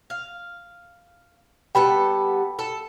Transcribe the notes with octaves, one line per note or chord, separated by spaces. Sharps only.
F5
G3 B3 A4 G5 B5
A4